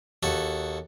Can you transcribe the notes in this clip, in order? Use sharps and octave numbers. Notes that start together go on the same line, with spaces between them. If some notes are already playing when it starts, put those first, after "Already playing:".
D#2 F#4 A4